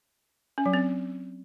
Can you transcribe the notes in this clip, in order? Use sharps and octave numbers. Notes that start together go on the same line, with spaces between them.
C#4
F#3
C4